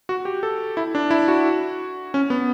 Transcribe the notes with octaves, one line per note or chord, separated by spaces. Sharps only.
F#4
G4
A4
E4
D4
E4
F#4
C#4
B3